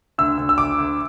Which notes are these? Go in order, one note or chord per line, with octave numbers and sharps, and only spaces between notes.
D2 E6
D2
E6
D2 D6
D2